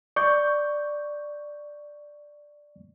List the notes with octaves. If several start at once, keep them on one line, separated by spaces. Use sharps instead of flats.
D5 C#6 G6